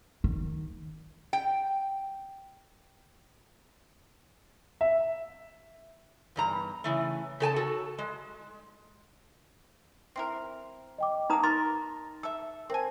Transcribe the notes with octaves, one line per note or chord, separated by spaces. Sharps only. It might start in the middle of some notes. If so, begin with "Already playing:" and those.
D#3
G5
E5
E2 G2 A#5
C#3 E3 A3
C#3 A4 G#5 A5
F#4 A4
G#3
C4 E4 A#4 C6
D#5 G5 D6
B2 A#3 D#4 A#5 D#6
A#4 C6 A6
A4 E5 E6
C4 A#4 C5 G#5 A5